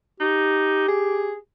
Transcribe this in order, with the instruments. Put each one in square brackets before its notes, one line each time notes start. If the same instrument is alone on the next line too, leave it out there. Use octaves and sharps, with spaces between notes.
[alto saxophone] D#4 [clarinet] G4
[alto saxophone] G#4